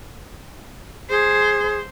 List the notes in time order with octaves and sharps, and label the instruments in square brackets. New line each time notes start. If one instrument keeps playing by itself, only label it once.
[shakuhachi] G#4 [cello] C5